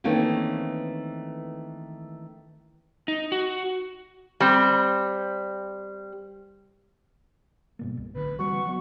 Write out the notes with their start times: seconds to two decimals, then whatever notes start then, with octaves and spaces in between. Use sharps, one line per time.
0.04 D#3 E3 A3 A#3 C4 C#4
3.08 D#4
3.32 F#4
4.40 G3 C4
7.79 G2 B2 A#3
7.97 C2
8.14 A1 D3 B4
8.39 E3 G3 C4 F#4 C#6
8.67 F#3 B3